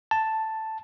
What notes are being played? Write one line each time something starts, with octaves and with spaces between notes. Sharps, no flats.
A5